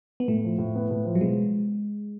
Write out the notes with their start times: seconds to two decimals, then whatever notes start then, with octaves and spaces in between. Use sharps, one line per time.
0.20 B3
0.28 A2 A3
0.43 F3
0.58 A2
0.75 B3
0.91 A2
1.05 F3
1.15 F#3
1.20 B2 G#3